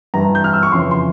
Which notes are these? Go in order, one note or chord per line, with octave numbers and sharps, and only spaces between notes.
G2 E3 A#5
G6
F6
E6
C#6
F2 C#3 E3 C6
C6